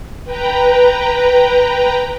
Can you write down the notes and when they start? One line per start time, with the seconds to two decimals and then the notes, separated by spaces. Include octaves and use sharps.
0.24 B4 G5 A#5